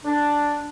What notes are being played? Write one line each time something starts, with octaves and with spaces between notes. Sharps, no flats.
D4